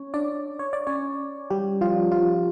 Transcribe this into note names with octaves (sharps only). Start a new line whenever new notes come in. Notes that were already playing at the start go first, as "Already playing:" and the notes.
Already playing: C#4 C#5
D4 D5
C#5
D5
C#4 C#5
G3 G4
F3 F4
F3 F4